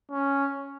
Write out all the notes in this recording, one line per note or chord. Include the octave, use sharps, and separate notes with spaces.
C#4